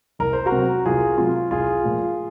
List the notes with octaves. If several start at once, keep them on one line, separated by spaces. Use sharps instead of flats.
C2 A#4
C5
F#4 A#4
C3 F#3
C2 F4 G#4
C3 F#3 F4
C2 F4 G#4
A#2 F3